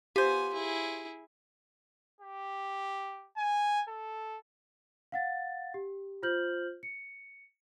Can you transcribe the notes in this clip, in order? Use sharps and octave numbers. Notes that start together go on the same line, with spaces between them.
B3 F4 G4 C5 G#5
E4 G#4
G4
G#5
A4
F5 F#5 A6
G4
F4 C5 F6 G6 F#7
C#7